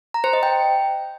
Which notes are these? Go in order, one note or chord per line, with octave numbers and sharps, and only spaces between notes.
A#5
C5
D#5
G5